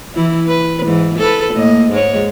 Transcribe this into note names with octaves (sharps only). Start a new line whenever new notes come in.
E3 E4
B4
G#2 E3
A4 B4
A2 A#3 D#5
G#2 G#3 C#5